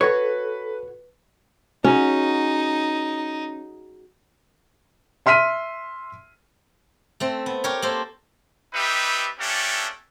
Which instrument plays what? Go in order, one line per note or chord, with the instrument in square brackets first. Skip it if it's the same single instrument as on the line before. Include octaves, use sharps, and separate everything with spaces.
[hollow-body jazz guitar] F#4 C#5 [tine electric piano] A4 [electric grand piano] B4
[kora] C#4 [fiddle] D#4 [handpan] F#4 G#4
[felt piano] E5 C6 F6 B6 D#7
[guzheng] A3 C4
B3
G4 A#4 C#5
A#3 A4 C5
[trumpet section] G3 C4 D#4 G4 B4 E5
A3 A#3 C#4 D4 G4 A4